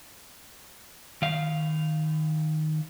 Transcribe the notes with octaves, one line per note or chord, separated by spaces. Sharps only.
D#3 F5